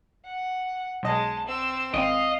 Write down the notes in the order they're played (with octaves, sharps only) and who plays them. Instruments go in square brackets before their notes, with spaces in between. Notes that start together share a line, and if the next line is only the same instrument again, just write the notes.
[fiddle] F#5
[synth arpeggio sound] B1 D#5 [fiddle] G#3 A5
[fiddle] C4 E6
[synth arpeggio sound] G#1 C4 [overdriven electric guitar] D#5 [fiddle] F5